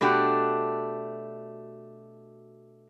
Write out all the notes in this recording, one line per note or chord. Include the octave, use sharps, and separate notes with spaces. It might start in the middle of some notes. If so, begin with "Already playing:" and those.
B2 A3 D4 F#4 G4